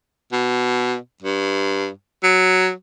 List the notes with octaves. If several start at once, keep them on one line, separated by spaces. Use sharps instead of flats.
B2
G2
F#3